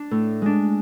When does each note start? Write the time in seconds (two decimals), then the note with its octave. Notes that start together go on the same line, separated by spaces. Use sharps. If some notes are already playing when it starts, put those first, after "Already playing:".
Already playing: D4
0.11 A2
0.42 G#3 D4